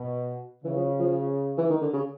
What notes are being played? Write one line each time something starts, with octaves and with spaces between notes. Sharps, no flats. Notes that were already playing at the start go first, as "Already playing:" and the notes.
Already playing: B2
C#3 E3
F3
F3
E3
D#3
D3
C#3